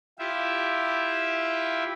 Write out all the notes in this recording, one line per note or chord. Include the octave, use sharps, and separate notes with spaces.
E4 F4 G4 E5